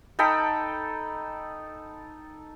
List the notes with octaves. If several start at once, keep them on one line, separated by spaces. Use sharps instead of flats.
D#4 A4 G5 B5